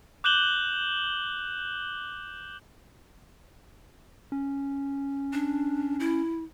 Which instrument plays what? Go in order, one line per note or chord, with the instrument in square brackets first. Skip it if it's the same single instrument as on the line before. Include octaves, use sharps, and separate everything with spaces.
[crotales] D6 F#6 G6 E7 F#7 G7
[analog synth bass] C#4
[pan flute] D4
E4